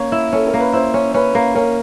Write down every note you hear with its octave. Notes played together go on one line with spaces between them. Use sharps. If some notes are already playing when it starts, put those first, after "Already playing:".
Already playing: A#3 C#4 C#5
E4
C#4 A4
A#4
A#3
B4
E4 C5
C#4
C#4 B4
A#3
C#4 A#4